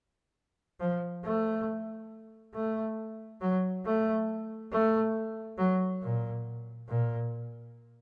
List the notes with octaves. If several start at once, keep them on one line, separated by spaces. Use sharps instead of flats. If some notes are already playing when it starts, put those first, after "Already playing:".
F3
A3
A3
F#3
A3
A3
F#3
A#2
A#2